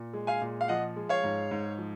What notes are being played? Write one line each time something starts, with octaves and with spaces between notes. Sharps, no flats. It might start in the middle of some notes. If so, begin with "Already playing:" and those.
Already playing: A#2
G#3
F5 G#5
A#2
F5
F3 D#5 F#5
G#3
C#5 F5
G#2
G#2
F3